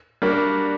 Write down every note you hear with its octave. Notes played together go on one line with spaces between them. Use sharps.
G3 A#3 D4 F#4 A#4